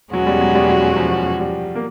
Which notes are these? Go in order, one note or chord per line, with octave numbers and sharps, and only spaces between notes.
E2 B2 F#3 G#3 C#4 F#4
G3
F#3
G3
F#3
F3
G3
A#3